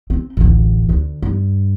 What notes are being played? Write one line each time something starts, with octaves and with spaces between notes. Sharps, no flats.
C4
D1 A1
D2
G2